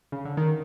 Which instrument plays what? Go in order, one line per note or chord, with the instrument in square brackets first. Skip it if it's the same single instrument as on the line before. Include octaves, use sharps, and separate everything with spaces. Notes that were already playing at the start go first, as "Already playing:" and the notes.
[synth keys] C#3
D3
D#3